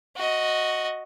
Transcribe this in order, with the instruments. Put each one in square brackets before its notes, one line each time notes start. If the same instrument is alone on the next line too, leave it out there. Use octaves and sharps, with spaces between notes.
[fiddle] F#4 D#5